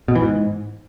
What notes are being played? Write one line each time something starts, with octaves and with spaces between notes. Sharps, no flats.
B2
E3
G#2